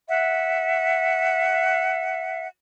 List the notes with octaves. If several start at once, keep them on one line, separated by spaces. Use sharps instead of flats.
E5 F#5